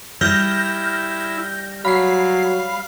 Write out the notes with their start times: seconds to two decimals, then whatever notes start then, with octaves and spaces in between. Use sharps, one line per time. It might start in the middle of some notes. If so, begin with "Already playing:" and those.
0.21 G3 E4 F6 G6 A#6
1.85 F#3 F5 B5 C7